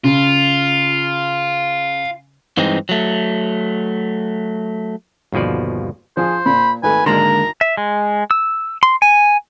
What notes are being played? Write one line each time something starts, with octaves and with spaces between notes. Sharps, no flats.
C#3 F4
G2 E3 G#3 C4 D#4
F#3 A3
G1 D#2 B2 F3 D5
F3 G#4 C5
A#2 B5
G#1 A3 B4 G#5
G#1 D3 G#3 A#3 A#4 A#5 C6
E5
G#3
E6
C6
G#5